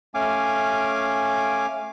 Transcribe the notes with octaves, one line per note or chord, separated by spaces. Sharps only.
A3 C#4 F5 G#5 D6